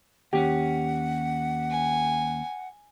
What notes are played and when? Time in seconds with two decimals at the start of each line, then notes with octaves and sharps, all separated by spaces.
0.33 D#2 C#4 G4 F#5
1.70 G#5